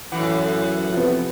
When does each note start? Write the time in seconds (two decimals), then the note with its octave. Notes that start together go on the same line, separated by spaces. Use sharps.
0.12 F#2 A2 E3 F#5
0.93 C3 F3 B3